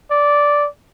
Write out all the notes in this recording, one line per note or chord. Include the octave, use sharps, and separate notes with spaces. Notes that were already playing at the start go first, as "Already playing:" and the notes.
D5